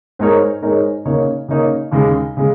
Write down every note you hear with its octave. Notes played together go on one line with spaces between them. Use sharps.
G#2 G#3 D#4 A#4 C#5
G#2 G#3 D#4 A#4 C#5
C#3 A#3 D#4 C#5
C#3 A#3 D#4 C#5
D#2 C#3 G#3
C#3 G#3